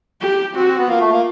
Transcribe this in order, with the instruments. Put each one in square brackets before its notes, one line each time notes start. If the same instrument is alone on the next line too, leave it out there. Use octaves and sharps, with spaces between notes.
[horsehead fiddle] G4
[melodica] C4 [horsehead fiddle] F#4
[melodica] C4
B3
[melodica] A#3 [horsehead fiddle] F4
[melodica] A3
A#3